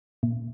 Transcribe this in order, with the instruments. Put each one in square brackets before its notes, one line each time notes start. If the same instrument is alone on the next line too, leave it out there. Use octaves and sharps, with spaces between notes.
[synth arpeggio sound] A#2